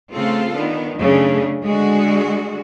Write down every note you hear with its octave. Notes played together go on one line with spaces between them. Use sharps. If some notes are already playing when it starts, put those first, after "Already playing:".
C#3 A3 C4 F4 A4
D#3 B3 D4
F#2 C#3 A3 D4
D3 G#3 F#4 G#4